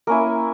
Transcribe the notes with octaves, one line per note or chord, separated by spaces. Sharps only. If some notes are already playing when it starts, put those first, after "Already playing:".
A#3 C#4 E4 A#4